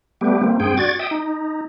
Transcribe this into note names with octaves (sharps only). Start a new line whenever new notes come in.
G3 A3 B3 G4
A#3 C4
G2 C4 G#4 G5
F#4 D5 G#6 A6
E5 G5 D#6
D#4